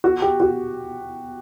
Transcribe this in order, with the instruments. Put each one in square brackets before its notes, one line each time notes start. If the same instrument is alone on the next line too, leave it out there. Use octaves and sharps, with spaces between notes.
[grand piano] F#4
G4
F#4